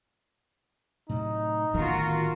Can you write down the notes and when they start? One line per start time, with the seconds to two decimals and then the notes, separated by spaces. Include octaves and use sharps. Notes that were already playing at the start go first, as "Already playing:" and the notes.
1.09 A2 C3 F#3 D#4
1.74 D1 D2 D#3 B3 F4 F#4 A#4